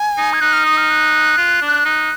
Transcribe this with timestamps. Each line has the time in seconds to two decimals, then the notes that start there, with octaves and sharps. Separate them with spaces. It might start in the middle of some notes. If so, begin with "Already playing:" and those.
Already playing: G#5
0.17 D#4
0.33 G#6
0.41 D#4 F#6
0.53 F6
0.66 D#6
0.77 F6
0.90 F#6
1.37 F4
1.61 D4
1.85 D#4